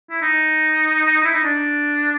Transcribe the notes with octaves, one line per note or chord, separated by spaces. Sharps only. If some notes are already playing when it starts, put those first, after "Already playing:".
E4
D#4
E4
D#4
D4